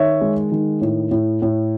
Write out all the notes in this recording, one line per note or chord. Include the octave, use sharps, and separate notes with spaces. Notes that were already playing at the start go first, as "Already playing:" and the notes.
Already playing: D#3 C#5 E5
G#3
D#3
A2
A2
A2